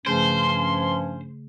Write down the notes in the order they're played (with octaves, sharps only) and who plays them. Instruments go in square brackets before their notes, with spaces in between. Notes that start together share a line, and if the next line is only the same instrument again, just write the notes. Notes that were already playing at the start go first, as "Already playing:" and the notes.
[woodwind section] G2 F3 C#4 [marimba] C#3 A3 G#4 [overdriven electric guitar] C5 [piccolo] C6